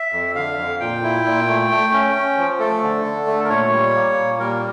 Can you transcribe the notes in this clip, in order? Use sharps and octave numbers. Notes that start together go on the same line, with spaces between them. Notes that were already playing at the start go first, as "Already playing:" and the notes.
Already playing: E5
F2
D3 F5
F2
A#2 G5
E4
A#2
A3
A3
C#4
C#4
F3
A3 A4
D3
D3
A3
A#4
A#2 C#5
G3
A#3
A#2
G3 A#4